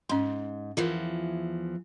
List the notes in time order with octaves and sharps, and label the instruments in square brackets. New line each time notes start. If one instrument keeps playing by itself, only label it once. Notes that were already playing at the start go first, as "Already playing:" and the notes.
[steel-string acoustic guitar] G#2 [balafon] C#4 C6
[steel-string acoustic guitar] E2 E3 F3 [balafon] F4 A#4